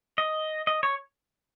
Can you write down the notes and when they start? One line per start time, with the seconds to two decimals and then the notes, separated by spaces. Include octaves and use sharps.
0.18 D#5
0.67 D#5
0.83 C#5